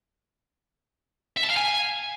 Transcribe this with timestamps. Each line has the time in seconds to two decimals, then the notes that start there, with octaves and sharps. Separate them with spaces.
1.37 E5
1.44 A5
1.50 F5
1.57 G#5